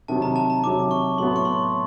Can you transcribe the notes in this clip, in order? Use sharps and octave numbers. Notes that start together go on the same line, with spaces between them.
C3 D#3 F#3 A5
A#5
A5
A#5
C3 D#3 F#3 D6
C#6
A2 F#3 B3 C6
C#6
C6